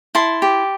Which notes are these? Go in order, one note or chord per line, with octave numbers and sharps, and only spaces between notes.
E4 A5 C6
G4